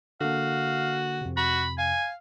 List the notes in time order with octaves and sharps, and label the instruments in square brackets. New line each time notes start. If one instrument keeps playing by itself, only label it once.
[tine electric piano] D3 A#3 [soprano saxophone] F#4 [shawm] F5
[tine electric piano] F2 C3
[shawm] F#4 [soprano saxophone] B5
[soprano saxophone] F5 [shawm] G#5